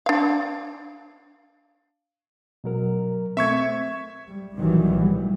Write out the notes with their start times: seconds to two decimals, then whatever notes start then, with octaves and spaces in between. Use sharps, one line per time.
0.06 D4 F5
2.64 B2 F#3 A#4
3.37 A3 C4 E5 C#6 G#6
4.28 G3
4.58 B1 D#3 E3 F#3 G3
4.90 A2